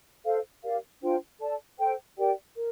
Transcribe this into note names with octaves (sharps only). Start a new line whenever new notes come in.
A4 C5 F5
G4 A#4 D5 F5
D4 F4 C5 G5
A4 D5 A5
A4 C5 G5
G4 A#4 D5 G5
A#4